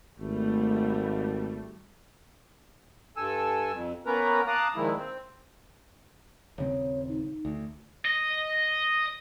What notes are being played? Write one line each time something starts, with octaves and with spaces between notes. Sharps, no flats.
G#1 G3 A3
G2 A4 G#5 E6
F2
A#3 B3 C#4 A#4 B4 A#5
F5 A5 A#5 D6 D#6 F#6
A#2 D#3 F3 G#3 E4
C4
D#1 C#3 C4 C#5
D#4
D2
D#5